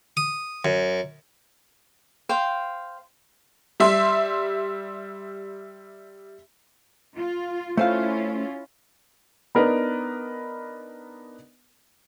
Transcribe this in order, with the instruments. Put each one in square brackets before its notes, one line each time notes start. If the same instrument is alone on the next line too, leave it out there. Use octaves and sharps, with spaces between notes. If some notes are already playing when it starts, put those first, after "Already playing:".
[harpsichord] D#6
F#2
[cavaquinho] C5 F5 G5
[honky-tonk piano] G3 E5 C6
[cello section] F4
[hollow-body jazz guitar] A3 C5 F5 [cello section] C#4 E4 F4
[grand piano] B3 D4 D#4 A#4 B4